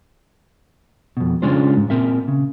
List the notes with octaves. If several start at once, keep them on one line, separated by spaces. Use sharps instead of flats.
F2 B2
C#3 G#3 C#4 D4 F4 C5
G#2
A#2 C4 A#4 E5
C#3